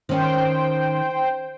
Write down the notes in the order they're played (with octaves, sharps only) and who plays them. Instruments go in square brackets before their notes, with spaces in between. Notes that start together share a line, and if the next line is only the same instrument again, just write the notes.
[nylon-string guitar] D#3 C#4 [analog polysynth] C5 G5